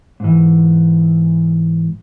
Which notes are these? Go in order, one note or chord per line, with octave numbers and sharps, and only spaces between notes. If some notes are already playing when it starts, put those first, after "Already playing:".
G#2 E3